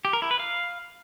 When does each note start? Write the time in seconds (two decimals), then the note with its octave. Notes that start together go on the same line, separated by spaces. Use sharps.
0.05 G4
0.13 A#4
0.22 E4
0.31 B4
0.40 F5